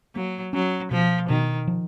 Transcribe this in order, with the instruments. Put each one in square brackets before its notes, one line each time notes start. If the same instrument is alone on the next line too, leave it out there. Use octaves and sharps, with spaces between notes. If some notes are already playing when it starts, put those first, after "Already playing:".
[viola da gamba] F#3 [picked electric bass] A#3
[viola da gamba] F#3 [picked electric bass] C#4
[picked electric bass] B2 [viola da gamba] F3
[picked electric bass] B2 [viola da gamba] D#3
[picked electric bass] F3